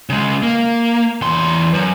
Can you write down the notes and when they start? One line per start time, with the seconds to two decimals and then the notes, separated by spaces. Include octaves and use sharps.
0.09 C#3 G#3
0.43 A#3
1.22 E2 C6
1.74 F#2